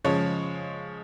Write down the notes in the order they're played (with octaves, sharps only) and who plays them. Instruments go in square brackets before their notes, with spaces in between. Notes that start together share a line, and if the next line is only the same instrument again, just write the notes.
[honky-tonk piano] C#3 F3 G#3 C#5